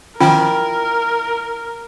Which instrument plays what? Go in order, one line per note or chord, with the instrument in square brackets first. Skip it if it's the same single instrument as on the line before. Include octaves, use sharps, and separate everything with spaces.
[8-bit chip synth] D#3 F3 C#4 [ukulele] E4 G5 [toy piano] F4 [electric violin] A#4